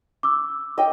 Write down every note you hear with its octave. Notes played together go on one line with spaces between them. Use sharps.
D6 E6
D#5 G5